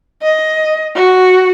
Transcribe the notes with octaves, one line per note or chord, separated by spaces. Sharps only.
D#5
F#4